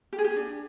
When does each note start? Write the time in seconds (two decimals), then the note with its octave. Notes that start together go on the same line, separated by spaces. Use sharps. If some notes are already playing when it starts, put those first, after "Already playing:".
0.13 G4
0.18 G#4
0.24 G4
0.30 G#4
0.36 D4